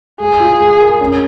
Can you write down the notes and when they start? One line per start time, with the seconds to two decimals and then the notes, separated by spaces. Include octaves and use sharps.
0.20 G#3 G#4
0.40 F4
0.60 G#3
0.80 A#4
1.01 C#4